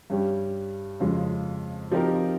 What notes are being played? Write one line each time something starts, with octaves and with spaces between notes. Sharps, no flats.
G2 G3 C#4 G4
F2 C#3 F3 G#3 C#4
F3 C4 D#4 G4 A#4